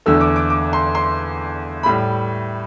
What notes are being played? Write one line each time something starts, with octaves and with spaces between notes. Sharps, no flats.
E2 D3 A3 E6
D6
D6
D6
C6
C6
A2 G3 B5